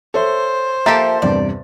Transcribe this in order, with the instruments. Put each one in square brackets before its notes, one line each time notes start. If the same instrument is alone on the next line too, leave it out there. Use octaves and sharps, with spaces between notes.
[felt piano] A4 C#5 E5 [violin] C5
[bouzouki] F3 E5 [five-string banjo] A#3 G4 A4 [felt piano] A6
[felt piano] E2 G2 C3 [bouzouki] D5